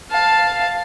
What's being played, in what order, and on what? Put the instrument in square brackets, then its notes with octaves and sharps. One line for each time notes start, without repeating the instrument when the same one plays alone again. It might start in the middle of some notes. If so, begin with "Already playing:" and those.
[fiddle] F5 A5